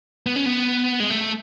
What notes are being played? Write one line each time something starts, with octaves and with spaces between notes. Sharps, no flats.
B3
C#4
B3
G#3
A3